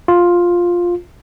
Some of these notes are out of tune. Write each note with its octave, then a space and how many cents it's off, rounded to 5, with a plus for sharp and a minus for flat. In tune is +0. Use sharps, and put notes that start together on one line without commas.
F4 +5